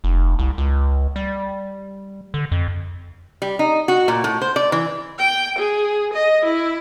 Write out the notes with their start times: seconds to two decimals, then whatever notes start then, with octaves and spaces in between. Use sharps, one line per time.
0.04 F1
0.39 C2
0.58 C#2
1.16 G3
2.34 D3
2.52 F2
3.42 G3
3.59 D#4
3.88 F#4
4.08 A#2
4.24 A2
4.42 C5
4.56 D5
4.72 E3
5.19 G5
5.59 G#4
6.13 D#5
6.44 E4